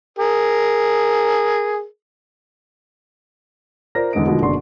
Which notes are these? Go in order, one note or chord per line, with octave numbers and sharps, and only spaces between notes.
G#4 A#4
F4 A#4 C5 D5 A#6
E2 D3 G#3 D#4 D#5 D7
B2 D3 D#3 F3 G#3 F#4
F#1 B2 D3 D5 C6 C#6